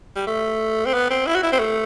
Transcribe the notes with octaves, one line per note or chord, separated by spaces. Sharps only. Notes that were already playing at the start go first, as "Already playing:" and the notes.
G3
A3
C4
B3
C4
E4
F#4
E4
C4
A3